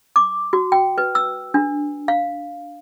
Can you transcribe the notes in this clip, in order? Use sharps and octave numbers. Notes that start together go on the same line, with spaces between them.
D6
F#4
G5
B4
E6
D4
F5